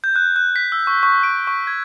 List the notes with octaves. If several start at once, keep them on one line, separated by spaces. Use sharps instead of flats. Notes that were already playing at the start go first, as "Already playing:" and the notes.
G6
F#6
F#6
B6
E6
C#6
C#6
D7
C#6
G#6